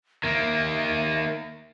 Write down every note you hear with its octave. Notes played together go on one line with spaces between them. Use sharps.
D#3 A#3 E5